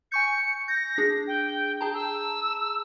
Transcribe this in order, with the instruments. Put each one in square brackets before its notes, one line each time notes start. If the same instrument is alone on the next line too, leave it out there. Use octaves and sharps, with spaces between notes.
[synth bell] G#5 C#6 G6 [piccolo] C#7
[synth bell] G6 [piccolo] A#6
[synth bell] D4 G#4
[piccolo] G5
[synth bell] G#4 A5 A#5 [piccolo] G5
[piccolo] E6